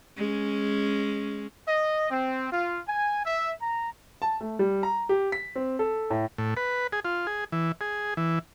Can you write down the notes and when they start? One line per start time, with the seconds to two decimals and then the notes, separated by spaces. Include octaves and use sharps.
0.17 G#3 C#4
1.68 D#5
2.11 C4
2.52 F4
2.87 G#5
3.24 E5
3.60 A#5
4.22 A5
4.41 A3
4.59 G3
4.83 A#5
5.09 G4
5.32 B6
5.55 C4
5.79 A4
6.10 A2
6.38 A2
6.57 B4
6.93 G#4
7.05 F4
7.27 G#4
7.52 E3
7.81 G#4
8.17 E3